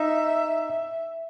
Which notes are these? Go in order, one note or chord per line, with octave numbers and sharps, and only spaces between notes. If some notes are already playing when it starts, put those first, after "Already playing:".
Already playing: D#4 E5